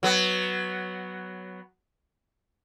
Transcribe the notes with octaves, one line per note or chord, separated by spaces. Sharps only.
F#3 B3